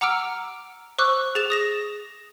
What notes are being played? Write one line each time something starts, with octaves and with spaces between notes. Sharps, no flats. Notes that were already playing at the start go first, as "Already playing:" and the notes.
F#5 A#5 D6 E6 F6 D7
C5 C#6 D6 E6 F#6
G#4 A6 E7 F7
D#6 A#6 E7